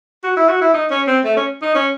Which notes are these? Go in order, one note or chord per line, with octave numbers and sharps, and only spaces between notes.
F#4
E4
F#4
E4
D#4
C#4
C4
A3
C#4
D#4
C#4